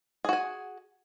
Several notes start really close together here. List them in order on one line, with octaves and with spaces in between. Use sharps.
G#4 F#4 G#5